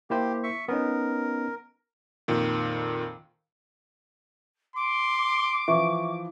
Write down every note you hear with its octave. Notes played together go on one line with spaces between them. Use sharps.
A#3 E4 G4 C5
E5 C#6
B3 C#4 D#4 A#4
F2 A#2 D#3
C6 D6
E3 F3 E5 C#6